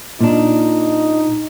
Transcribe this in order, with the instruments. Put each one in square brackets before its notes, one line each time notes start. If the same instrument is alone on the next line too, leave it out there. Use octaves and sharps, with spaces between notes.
[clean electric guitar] A#2 D4 [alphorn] D#4